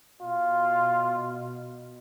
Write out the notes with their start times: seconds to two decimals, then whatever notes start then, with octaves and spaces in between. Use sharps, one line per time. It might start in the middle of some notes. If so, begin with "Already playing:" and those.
0.22 B2 F4